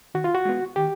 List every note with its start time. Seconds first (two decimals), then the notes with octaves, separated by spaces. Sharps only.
0.14 D#3 F#4
0.24 F4
0.35 F#4
0.45 G#3 B3
0.76 D#3 G4